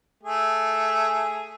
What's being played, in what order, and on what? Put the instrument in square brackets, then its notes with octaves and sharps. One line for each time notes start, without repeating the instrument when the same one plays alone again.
[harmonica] A3 G#4